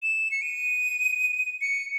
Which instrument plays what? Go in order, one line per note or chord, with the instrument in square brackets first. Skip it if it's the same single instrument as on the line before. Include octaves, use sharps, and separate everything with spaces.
[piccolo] E7
C#7
D#7
C#7